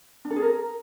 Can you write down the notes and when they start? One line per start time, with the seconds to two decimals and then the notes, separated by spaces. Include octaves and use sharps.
0.25 D4
0.31 A4
0.36 G#4
0.42 A#4